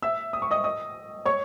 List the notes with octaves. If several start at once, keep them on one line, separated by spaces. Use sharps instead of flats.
E5 E6
D#6
C#6
D#5 D#6
D#5 D#6
C#5 C#6